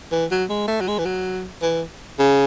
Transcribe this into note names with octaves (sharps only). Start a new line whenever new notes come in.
E3
F#3
G#3
A3
F#3
G#3
E3
F#3
E3
C#3